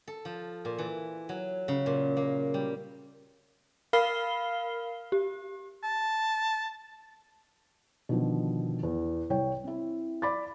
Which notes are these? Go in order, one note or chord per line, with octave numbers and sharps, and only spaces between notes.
A4
F3
A#2
E3
F#3
C#3
A#2
A#3
G3
A#4 F5 B5 F6 C7 G7
G4
A5
B2 D3 D#3 F3
E2
C2 C#5 G5
C4 E4
D5 B5 D6 A6